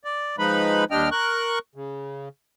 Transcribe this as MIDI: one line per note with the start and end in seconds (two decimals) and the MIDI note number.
0.04 0.36 74
0.38 0.84 53
0.38 0.84 56
0.38 0.84 63
0.38 0.84 71
0.38 0.84 83
0.91 1.09 39
0.91 1.09 55
0.91 1.09 62
0.91 1.09 75
0.91 1.09 79
0.91 1.09 89
1.11 1.59 70
1.11 1.59 85
1.11 1.59 90
1.75 2.29 49